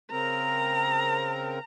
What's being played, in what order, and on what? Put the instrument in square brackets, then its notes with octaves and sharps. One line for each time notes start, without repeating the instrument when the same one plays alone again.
[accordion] C#3 C4 A#4 [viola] A#5